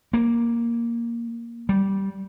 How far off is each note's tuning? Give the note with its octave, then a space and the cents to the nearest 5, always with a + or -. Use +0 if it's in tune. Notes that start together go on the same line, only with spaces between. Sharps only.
A#3 +5
G3 -10